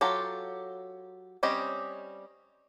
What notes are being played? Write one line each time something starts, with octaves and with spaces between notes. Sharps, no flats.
F#3 F4 G4 A4
G3 C4 C#4 G4 D#5